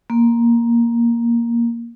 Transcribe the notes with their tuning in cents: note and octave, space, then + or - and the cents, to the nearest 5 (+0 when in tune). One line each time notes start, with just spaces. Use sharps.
A#3 +5